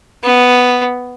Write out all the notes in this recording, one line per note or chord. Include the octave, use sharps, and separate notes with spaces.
B3